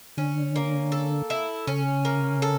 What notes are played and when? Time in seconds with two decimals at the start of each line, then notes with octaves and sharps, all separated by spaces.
0.17 D3 C#4
0.56 A#3
0.92 A4
1.30 E4
1.67 C#3 C#4
2.05 A#3
2.42 A4